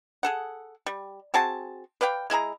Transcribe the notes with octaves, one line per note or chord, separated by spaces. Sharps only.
G#4 A4 F#5
G3
C4 F#4 G#4 A5
B4 D5 F5 G5
G#3 E4 G#4 A#5